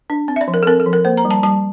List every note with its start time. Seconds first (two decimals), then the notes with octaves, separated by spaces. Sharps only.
0.10 D4
0.28 C4
0.36 E5
0.41 D5
0.48 F3
0.54 A#4
0.63 A4
0.67 C4 A#4
0.80 A4
0.86 F3
0.93 A#4
1.05 A#3 C5
1.17 A#5
1.25 G3
1.31 A5
1.43 G3 A5